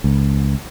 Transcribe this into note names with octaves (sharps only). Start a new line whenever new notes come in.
C#2